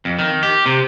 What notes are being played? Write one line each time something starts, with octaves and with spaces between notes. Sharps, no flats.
F2
D#3
G4
C3